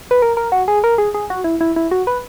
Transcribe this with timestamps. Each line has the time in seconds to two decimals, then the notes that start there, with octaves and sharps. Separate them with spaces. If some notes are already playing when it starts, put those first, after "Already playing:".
0.11 B4
0.22 A#4
0.37 A#4
0.52 F#4
0.68 G#4
0.84 A#4
0.98 G#4
1.14 G#4
1.30 F#4
1.44 E4
1.61 E4
1.76 E4
1.91 F#4
2.07 B4